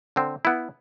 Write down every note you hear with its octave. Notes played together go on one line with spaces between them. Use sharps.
D3 C4
B3 E4